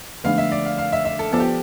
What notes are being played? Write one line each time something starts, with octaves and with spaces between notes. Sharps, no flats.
D3 F3 A3 D4 F5
E5
D5
F5
F5
E5
E5
A4
F3 B3 F4 A4 C5
G4